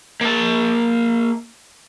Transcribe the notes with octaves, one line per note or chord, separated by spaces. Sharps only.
A#3 A5